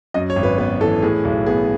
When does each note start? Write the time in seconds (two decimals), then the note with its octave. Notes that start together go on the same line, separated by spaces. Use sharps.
0.14 F#2 D#5
0.30 C#5
0.36 G#1
0.43 B4
0.58 B3 B4
0.80 E3 A4
1.03 A2 G#4
1.25 B1
1.46 B3 G#4